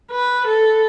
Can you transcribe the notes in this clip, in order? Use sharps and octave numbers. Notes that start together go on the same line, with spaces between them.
B4
A4